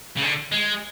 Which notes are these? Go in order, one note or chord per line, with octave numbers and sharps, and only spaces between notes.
C#3
D3
G#3